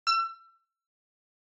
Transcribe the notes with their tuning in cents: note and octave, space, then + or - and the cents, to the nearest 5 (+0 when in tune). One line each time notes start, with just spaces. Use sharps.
E6 +35